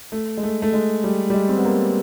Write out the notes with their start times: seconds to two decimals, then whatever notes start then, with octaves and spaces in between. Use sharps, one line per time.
0.12 A3
0.37 G#3
0.43 A3
0.62 A3
0.73 G#3
1.04 G3
1.30 G3
1.34 G#3
1.49 C4
1.57 B3
1.65 A#3